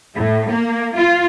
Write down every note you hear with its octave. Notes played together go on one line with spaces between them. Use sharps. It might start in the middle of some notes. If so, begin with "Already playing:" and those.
A2
A#3
F4